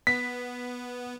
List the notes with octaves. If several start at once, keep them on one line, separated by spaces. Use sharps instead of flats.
B3 B6